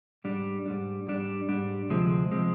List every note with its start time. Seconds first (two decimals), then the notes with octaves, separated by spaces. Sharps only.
0.24 G#2 G3 D4
0.66 G#2 G3 D4
1.07 G#2 G3 D4
1.48 G#2 G3 D4
1.90 D2 C3 F3 G#3 C4
2.31 C3 F3 G#3 C4